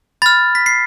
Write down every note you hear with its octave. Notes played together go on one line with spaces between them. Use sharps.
B5 F6 A6
B6
C7